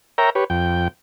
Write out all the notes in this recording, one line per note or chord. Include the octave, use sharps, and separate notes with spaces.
A#4 C#5 E5 G5 A#5
G4 B4 C#5
F2 G5